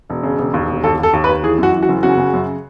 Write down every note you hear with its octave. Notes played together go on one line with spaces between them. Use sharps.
E1
C#3
E1
D#2
E1
D#2 A4
D#2 A4
D#2
B4
D#2
E3 G#4
F#2 F#4
E3
F#4
F#1
C#3 F#4
C#3
F#2